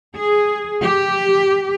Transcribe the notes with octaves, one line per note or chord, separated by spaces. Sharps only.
G#4
G4